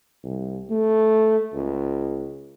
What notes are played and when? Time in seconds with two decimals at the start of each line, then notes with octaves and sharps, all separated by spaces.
0.24 C2
0.70 A3
1.53 C#2